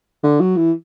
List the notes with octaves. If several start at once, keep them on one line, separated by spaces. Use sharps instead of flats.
D3
F#3
E3